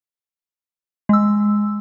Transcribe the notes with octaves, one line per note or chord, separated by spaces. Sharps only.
G#3 E6